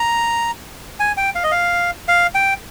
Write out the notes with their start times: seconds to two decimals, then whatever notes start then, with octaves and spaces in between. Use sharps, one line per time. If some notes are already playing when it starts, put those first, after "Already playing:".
Already playing: A#5
1.00 G#5
1.17 G5
1.35 F5
1.43 D#5
1.52 F5
2.08 F5
2.35 G5